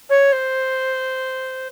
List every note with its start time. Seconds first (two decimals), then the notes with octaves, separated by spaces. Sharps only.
0.09 C#5
0.32 C5